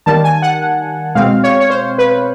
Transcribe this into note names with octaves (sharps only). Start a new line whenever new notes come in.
D#3 G3 A#3 A5
G#5
F#5
B2 G#3 C4 F5
C#5
C#5
C5
B4